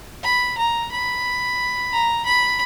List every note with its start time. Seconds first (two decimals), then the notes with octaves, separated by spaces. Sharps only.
0.23 B5
0.58 A#5
0.91 B5
1.92 A#5
2.25 B5